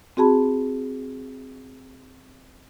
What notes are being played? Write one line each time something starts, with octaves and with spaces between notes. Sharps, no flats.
C4 F#4 G#4 A5 B5